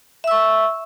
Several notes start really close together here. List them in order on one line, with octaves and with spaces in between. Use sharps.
E5 E6 C#6